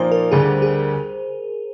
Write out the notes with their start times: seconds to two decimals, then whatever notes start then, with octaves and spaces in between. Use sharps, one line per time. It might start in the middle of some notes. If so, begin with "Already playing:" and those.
Already playing: A#2 F3 A#3 D#4 C5
0.12 A#4
0.32 D2 D3 G3 D4 G#4
0.62 G#4